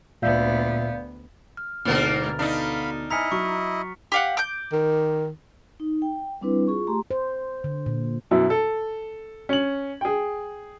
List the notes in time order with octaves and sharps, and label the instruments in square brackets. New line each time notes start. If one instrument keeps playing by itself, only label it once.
[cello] D2 B3 [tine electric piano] A#2 E5 [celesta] D5 F5 G6
[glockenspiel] F6
[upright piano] D2 B2 B3 [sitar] G#2 A#3 D4 [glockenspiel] F6 A6
[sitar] D4 D#4 [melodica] F5 B5
[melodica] E4 D#5 [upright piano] G#5 F6 [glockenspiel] A#5 B6 C#7
[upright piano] F#3 [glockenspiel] C#6
[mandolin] G4 F5 F#5
D6 G6
[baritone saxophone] D#3
[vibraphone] D#4
G5
G3 C4 D4 E4 B4
F4 G#4 C#6
A3 G4 A#5 C6
[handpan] C5
D3
A#2
[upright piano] F#2 B2 E4
A4
C#4 F#7
G#4 G5